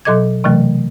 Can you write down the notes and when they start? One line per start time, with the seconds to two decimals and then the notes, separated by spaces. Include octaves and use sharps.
0.05 B2 F#3 A4 D#5 D6 G#6
0.44 C3 E3 F#3 A3